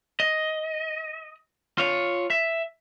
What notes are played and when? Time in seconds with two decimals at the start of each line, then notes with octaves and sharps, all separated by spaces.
0.20 D#5
1.78 F4 C#5
2.30 E5